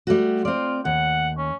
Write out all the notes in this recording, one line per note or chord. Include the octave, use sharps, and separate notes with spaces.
G3 A3 F#4
C4 F4 D5
D#2 F#5
C#4